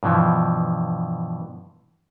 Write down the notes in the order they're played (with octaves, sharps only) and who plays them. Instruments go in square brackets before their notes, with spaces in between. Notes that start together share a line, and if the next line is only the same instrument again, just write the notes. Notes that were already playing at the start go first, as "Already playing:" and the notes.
[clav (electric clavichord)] G2 B2 E3 F3